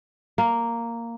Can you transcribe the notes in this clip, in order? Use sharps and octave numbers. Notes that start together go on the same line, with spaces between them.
A#3